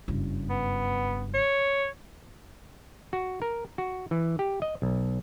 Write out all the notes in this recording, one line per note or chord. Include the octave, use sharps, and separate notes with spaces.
F#1 G2
B3
C#5
F#4
A#4
F#4
E3
G4
D#5
B1